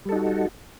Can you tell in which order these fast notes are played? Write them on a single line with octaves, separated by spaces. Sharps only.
G3 A4 D#4 F#4